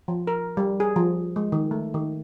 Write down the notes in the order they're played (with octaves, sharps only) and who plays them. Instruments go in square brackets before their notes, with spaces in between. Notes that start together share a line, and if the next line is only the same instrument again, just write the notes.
[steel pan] F3
A#4
G3
G#4
F3
G#3
D#3
A3
D#3